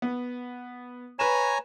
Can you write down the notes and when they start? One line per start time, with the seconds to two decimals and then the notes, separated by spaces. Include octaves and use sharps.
0.02 B3
1.19 B4 C#5 G#5 A#5 E7